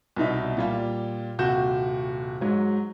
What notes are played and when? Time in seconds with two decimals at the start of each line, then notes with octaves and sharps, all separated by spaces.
0.16 C2 B2 D#4 E5
0.57 A#2 G3 F4
1.39 D#1 C3 F#4 G6 E7
2.41 G#2 F#3